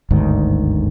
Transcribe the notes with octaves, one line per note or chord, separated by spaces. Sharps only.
G1 D2 G#2 D#3